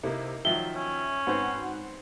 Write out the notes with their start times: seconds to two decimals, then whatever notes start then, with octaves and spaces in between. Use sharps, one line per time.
0.04 C3 A#3 D#4 E4
0.45 D#3 F3 F#3 E5 G7
0.76 C#4
1.27 G#2 B3 C4 F#4 C5